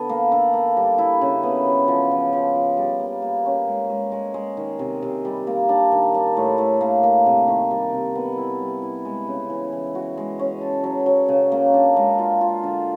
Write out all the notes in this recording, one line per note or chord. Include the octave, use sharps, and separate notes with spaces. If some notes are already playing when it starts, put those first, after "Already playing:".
Already playing: D3 B3
A#3
D3
A#3
G3
E4
C#3
B3
F#3
F3
F3
F3
F3
G3
A#3
A#3
C#4
G#3
G#3
G#3
G#3
D#3
C3
C3
G3
A#3
D4
D#3
D4
A2
A2
A#3
A#3
C3
D#3
G3
C3
B3
E4
G3
E4
G#3
C#3
E3
E3
F#4
G#3
C#4
A4
F#3
F#3
C#3
A#3
D4
G#3
F4
F4
D3